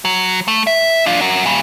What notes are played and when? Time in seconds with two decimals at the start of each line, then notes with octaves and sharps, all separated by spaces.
0.05 F#3
0.48 A3
0.67 E5
1.06 D4 F4
1.21 F#4 A#4
1.46 A#2 G3